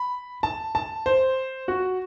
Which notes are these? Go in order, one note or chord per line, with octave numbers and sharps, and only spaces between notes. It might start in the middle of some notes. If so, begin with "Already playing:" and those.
Already playing: B5
A5
A5
C5
F#4